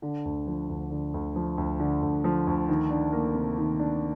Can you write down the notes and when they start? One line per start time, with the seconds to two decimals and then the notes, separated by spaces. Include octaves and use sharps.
0.02 D3
0.25 D2
0.47 F3
0.69 D2
0.91 D3
1.14 D2
1.36 F3
1.58 D2
1.80 D3
2.02 D2
2.24 F3
2.47 D2
2.69 D#3
2.90 D4
3.12 A#3
3.35 C3
3.58 D#3
3.79 D4